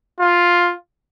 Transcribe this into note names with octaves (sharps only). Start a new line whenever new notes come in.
F4